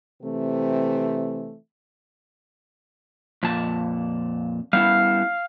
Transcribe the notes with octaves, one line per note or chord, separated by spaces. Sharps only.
C3 E3 A3 C4
F2 A#2 A5
G3 B3 E4 F5